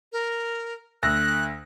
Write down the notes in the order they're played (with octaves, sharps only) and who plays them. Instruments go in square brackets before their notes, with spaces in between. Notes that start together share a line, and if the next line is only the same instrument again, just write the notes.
[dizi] A#4
[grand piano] D2 E6 A#6 [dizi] F#6